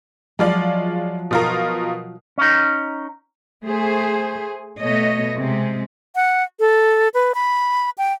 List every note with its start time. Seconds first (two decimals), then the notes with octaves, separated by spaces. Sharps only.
0.39 F3 F#3 G#3 F4 D5
1.31 B2 F4 A#4
2.38 C#4 D#4
3.66 A3 G#4 C5
4.80 B2 A3 C#5 D#5
5.34 C3 G#3
6.15 F#5
6.60 A4
7.14 B4
7.35 B5
7.98 G5